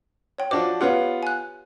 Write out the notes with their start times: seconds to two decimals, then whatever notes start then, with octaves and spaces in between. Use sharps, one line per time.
0.38 C#5 G5
0.51 F3 D4 F#4 C5 D6
0.81 B3 F4 G4 B4 C#5 F#5
1.23 G#5 F#6